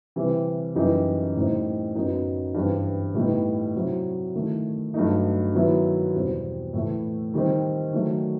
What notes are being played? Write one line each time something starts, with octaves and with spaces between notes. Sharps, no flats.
C3 E3 G3
F#2 E3 G3 D#4
A2 G3 C4 D#4
F#2 F#3 B3 D#4
G2 E3 G3 C4
A2 G3 B3 D#4
C3 F#3 C4 E4
D#3 A3 E4
G2 F#3 A3 D#4
D#3 F#3 B3 E4
E2 B2 G3 C4
A2 E3 A3 E4
D#3 G3 C4 D#4
D#3 F#3 A3